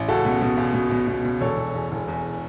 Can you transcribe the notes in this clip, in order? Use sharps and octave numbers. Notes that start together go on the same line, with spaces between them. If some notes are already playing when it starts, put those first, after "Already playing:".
Already playing: A1
C#2 F#4 A4
B2
B2
C#2
B2
B2
B2
B2
E1 A4 C#5
E1
E2
E1
E2